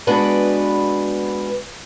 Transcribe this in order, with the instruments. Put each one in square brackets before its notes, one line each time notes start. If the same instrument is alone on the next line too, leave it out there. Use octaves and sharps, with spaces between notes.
[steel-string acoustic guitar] G#3 B3 D4 F#4 B4